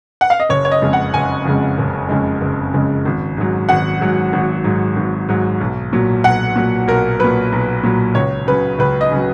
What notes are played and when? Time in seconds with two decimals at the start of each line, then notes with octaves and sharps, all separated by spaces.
0.21 F#5
0.30 F5
0.40 D#5
0.49 F#1 C#5
0.65 C#5
0.72 D#5
0.82 F2 C#3 G#3
0.93 F#5
1.14 F#1 G#5
1.45 F2 C#3 G#3
1.78 F#1
2.09 F2 C#3 G#3
2.41 F#1
2.74 F2 C#3 G#3
3.05 G#1
3.37 G#2 F#3
3.69 G#1 F#5
4.00 G#2 F#3
4.33 G#1
4.64 G#2 F#3
4.96 G#1
5.29 G#2 F#3
5.61 B1
5.93 A#2 F#3
6.24 B1 F#5
6.56 A#2 F#3
6.88 B1 A#4
7.19 A#2 F#3 B4
7.52 B1
7.83 A#2 F#3
8.15 C#2 C#5
8.47 C#3 F#3 B4
8.79 C#2 B4
9.01 D#5
9.11 C#3 F#3